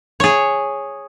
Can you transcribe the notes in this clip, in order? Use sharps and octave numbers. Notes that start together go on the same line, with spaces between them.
G#4 C#5